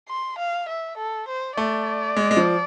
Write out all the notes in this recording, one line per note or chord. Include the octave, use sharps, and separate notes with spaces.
C6
F5
E5
A4
C5
A3 D5
G#3
G#3
F3